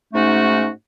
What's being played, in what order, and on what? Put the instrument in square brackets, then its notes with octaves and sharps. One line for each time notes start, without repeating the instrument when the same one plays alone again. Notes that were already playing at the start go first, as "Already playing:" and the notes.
[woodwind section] G#2 A3 C#4 D#4 F#4